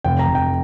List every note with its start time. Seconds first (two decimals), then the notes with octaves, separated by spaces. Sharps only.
0.04 F1 G5
0.19 A#5
0.27 F1
0.35 G5